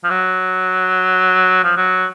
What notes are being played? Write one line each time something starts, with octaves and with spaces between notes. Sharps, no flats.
F3
F#3
F3
F#3